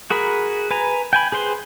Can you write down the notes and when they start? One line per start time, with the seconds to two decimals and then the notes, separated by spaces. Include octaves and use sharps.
0.10 F#4 G#4 A#4 B5
0.71 B4 G#5 A#5
1.13 G5 G#5 B5
1.32 G#4 B4 C5 C6